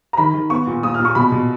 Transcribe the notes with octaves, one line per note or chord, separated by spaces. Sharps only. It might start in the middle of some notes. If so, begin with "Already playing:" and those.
A#5
D#3 B5
D#3
B3 C#6
A#2
A#2 D#6
F6
A#2 C#6
B2 B5
B2